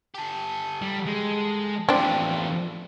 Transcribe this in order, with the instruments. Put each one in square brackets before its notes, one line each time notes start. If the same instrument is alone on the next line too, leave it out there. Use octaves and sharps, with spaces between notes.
[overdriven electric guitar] G4 A4
[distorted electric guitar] G3
G#3
[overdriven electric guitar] E2 F3 [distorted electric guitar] E3 A3 [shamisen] C4 D4